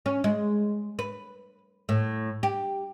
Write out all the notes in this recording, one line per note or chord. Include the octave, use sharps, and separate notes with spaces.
C#4
G#3
B4
A2
G4